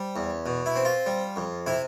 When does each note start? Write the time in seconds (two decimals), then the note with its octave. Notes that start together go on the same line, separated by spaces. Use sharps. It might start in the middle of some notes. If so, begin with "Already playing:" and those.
Already playing: G3 C5
0.16 E2
0.46 B2
0.66 E4
0.76 C4
0.85 F4
1.06 G3
1.36 F2
1.67 C3 E4